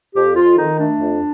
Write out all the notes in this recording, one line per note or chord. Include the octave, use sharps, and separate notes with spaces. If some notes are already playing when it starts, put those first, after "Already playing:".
F2 G4
F2 F4
D#3 D#4
A3 D4
F2